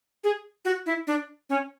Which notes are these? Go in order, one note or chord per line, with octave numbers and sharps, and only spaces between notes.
G#4
F#4
E4
D4
C#4